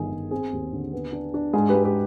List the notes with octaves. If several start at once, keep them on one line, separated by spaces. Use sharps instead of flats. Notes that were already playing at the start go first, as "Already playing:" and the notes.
Already playing: G1 D#3 G#4
G1
C4 G#4
D#2
D3
B3
D4
D4
G#2 G#4
G4 B4
G#2
G4 B4